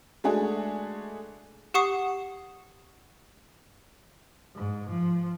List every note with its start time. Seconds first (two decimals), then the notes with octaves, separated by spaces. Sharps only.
0.24 G#3 A3 D4 F#4 G#4
1.74 G4 F#5 C#6 D#6 C7
4.55 G#2
4.90 F3